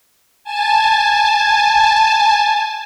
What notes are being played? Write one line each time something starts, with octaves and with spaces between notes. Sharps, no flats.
G#5 A5